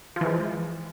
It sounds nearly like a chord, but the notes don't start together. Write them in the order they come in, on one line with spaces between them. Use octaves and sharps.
F3 E3 G#3